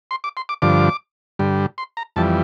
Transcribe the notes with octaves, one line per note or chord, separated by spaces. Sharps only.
C6
D6
C6
D6
G2 D3 F3 D6
G2 D3 G3
C6
A#5
F2 E3 G3 A5